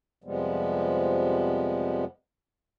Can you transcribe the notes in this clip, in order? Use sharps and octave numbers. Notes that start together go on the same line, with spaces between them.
F2 C3 F3 G3 G#3 B3